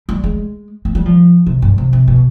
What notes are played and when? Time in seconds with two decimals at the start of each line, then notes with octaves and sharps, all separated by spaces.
0.09 G3
0.24 G#3
0.85 B3
0.95 G3
1.06 F3
1.46 C3
1.62 G2
1.78 C3
1.93 C3
2.08 B2